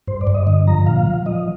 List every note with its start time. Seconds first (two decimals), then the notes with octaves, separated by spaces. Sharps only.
0.08 G2 C5
0.21 D5
0.27 G2
0.34 D#5
0.47 D3 D#5
0.67 F3 A#5
0.86 A#2 F5
1.07 F3
1.26 F3 D#5